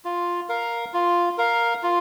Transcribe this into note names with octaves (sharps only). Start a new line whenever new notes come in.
F4
A#4 F5
F4
A#4 F5
F4